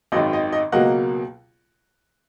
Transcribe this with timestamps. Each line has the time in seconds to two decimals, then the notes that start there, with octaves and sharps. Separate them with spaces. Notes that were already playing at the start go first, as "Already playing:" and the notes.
0.12 G#1 F#2 D#3 D#5
0.33 D#5
0.53 D#5
0.72 C#2 B2 F#3 A#3 D#5 F#5